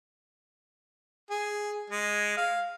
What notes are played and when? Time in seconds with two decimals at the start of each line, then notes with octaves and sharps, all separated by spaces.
1.30 G#4
1.90 G#3
2.37 F5